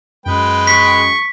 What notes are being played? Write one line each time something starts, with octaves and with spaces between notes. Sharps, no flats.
F#2 G#3 B4 G5
C#6 B6